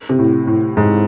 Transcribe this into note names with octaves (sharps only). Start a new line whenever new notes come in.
C3
A2
A2
G#2